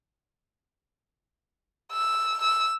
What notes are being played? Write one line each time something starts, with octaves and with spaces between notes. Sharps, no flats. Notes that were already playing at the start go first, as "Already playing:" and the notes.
E6
E6